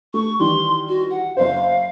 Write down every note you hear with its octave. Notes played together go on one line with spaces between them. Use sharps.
A3 C#6
D#3 E3 G3 C6
F#4
F#5
F#1 C5 F5